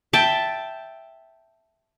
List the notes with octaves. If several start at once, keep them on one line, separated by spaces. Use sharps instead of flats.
E5 G5 A5